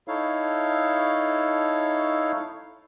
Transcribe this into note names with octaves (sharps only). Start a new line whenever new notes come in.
D#4 E4 A4 C#5 F5